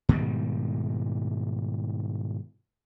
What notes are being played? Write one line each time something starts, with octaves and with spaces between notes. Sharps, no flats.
G#2 B2 D#3 G3